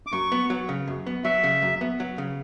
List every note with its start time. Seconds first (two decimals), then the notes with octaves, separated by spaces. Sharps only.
0.07 D6
0.12 F#2 C#6
0.32 B3
0.50 F#3
0.69 C#3
0.88 F#2
1.07 B3
1.24 F#3 E5
1.44 C#3
1.62 F#2
1.81 B3
2.00 F#3
2.18 C#3